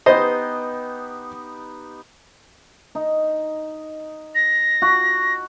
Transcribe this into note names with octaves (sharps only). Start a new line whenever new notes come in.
B3 D#4 G4 C5 D#5
D#4
A#6
F#4